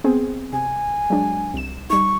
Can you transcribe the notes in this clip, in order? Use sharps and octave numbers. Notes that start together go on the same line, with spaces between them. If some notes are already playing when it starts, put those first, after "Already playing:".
B3 C4 G#4
C3 G#5
F#3 G#3 D4
C2 E7
G3 D#4 C#6